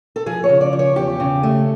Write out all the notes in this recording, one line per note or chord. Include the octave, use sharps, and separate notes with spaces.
A4
F3 G#4
C#5
C#3
D5
F3
C#5
E2 G4
C#3
A3